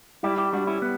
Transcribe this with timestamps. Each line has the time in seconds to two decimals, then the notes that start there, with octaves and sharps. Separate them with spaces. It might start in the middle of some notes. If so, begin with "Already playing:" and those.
0.23 G3 E4 G4
0.38 E4 G4
0.53 G3 D4 F#4
0.67 C#4 E4
0.82 B3